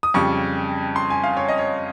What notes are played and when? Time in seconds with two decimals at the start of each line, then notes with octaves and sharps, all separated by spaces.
0.03 D#6
0.14 F2 C#3 G3 C#6
0.96 C6
1.10 G#5
1.24 F5
1.37 C#5
1.49 D#5
1.59 C#5